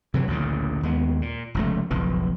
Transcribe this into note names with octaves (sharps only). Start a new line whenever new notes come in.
C3 E3 F#3
A1 D2 A#2 C#3
D#2 G#3 B3
A#2
F1 C#2 A3
F#1 B1 F2 E3